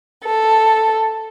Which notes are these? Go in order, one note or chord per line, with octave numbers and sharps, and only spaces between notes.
A4